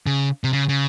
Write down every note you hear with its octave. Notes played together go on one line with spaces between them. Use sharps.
C#3
C3
C#3
C#3